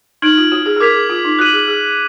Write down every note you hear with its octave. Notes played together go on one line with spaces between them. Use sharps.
D#4 F6 G#6 D7 F#7
F4
F#4
G#4
G#4
A#4 D6 G#6 B6 F7
G#4
F4
D#4
F#4 F#6 B6 D#7 F#7
G#4
G#4